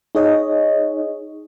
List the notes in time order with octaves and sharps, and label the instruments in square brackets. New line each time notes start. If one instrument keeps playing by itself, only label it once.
[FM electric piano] D#4 G#4 C#5 D#5